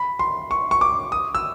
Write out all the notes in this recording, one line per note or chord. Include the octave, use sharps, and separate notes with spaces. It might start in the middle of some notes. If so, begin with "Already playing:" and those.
Already playing: B5
C6
C#6
C#6
D6
D#6
E6